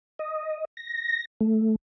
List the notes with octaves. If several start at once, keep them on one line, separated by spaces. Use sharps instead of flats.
D#5
A#6
A3